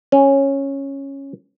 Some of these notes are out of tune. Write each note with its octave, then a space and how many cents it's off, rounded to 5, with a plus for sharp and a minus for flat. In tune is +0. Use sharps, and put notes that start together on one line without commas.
C#4 -10